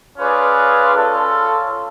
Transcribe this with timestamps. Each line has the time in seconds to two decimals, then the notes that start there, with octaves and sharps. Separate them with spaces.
0.18 C#4 F4 G#4 B4 D5
0.93 C#4 F4 A4